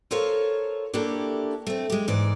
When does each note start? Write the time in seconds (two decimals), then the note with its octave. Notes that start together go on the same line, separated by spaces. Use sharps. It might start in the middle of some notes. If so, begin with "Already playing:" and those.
0.11 F4 A4 A#4 C5 C#5 F5
0.94 A#3 D4 E4 F#4 G4 A4
1.67 A3 C4
1.90 G#3 G4
2.08 G#2 E3 D5